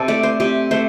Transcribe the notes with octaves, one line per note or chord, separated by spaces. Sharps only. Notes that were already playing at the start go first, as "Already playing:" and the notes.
Already playing: C3 A4
A3 D5
C5
C3 G4
A3 C5